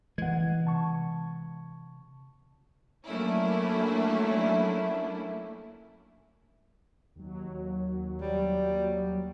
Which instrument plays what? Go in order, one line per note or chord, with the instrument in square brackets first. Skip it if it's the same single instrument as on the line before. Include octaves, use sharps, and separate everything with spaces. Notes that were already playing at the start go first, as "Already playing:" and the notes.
[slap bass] E3 G#3 [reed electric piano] F#5 G#6
[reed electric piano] C3 A5 C#6
[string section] F#3 A3 A#3 C#4 D4 E4
[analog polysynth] D#2 F#3
[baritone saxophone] G3